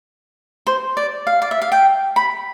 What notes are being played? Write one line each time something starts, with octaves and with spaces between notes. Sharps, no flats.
C5
D5
F5
D5
E5
F5
G5
B5